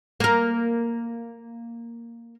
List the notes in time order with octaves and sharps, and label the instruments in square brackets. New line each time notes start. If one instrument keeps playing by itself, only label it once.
[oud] A#3 A#4